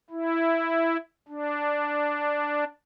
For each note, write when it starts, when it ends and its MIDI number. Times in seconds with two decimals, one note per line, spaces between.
0.10 0.97 64
1.29 2.64 62